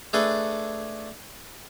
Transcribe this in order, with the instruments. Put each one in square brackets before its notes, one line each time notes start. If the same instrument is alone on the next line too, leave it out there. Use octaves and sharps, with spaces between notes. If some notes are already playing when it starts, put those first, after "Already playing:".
[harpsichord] A3 D4 G#4 A4 B4